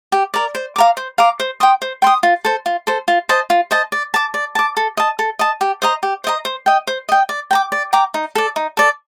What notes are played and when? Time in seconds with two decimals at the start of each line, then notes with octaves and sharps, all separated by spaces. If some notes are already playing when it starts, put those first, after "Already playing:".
0.12 G4
0.34 A#4 D5
0.55 C5
0.76 F5 A#5 D6
0.97 C5
1.18 F5 A#5 D6
1.40 C5
1.60 G5 C6 D#6
1.82 C5
2.02 G5 C6 D#6
2.23 F4
2.45 A4 C5
2.66 F4
2.87 A4 C5
3.08 F4
3.29 C5 D#5 A5
3.50 F4
3.71 C5 D#5 A5
3.92 D5
4.14 A5 D6
4.34 D5
4.55 A5 D6
4.77 A4
4.97 D#5 A5
5.19 A4
5.39 D#5 A5
5.61 G4
5.82 C5 D#5 A#5
6.03 G4
6.24 C5 D#5 A#5
6.45 C5
6.66 D#5 G5
6.87 C5
7.09 D#5 G5
7.29 D5
7.51 G5 A#5 D6
7.72 D5
7.93 G5 A#5 D6
8.14 D#4
8.35 A4 D5
8.56 D#4
8.77 A4 D5